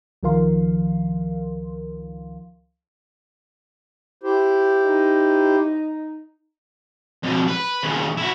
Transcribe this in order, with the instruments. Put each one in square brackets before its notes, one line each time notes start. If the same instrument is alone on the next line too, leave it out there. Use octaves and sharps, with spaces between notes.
[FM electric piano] C#2 D#3 F3 A#4 F5 C6
[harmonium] E4 G4 C5
[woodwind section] D#4
[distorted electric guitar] F2 B2
B4
D#2 C#3
E4 F#4